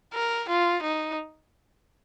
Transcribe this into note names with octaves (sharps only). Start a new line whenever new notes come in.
A#4
F4
D#4